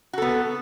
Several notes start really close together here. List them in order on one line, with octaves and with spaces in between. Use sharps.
F#4 A4 B3